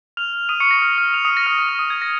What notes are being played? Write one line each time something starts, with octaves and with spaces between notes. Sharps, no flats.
F6 F7
D#6 D#7
C#6 C#7
A#6
F6
F6
F6 F7
D#6 D#7
A#6
F6
F6
F6
D#6
G#6
A#6